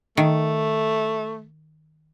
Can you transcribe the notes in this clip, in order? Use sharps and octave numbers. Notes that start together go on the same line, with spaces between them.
D#3 A3